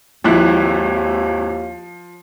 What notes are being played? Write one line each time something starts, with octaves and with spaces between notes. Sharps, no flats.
G#1 D#2 F3 E4 F#6